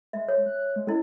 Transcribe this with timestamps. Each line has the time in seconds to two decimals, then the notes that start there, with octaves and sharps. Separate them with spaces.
0.13 G#3 E5
0.28 C#5
0.46 F#6
0.76 G#3
0.87 C#4 E4 A4 D#5